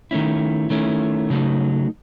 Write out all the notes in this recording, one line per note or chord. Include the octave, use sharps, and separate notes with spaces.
D#3 A3 C#4 E4
D#3 A3 C#4 E4
C#3 F#3 A3 D#4